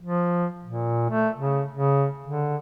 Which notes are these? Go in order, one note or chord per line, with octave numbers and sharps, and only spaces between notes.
F3
A#2
A3
C#3
C#3
D3